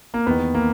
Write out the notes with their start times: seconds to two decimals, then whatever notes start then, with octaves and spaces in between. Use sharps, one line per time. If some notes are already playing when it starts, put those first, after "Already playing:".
0.14 A#3
0.26 E2 B3
0.30 D#3
0.54 A#3